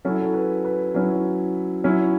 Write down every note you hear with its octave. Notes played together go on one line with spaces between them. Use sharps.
F#3 C#4 E4 A4
A4
B4
B4
F#3 C#4 E4
F#3 C#4 E4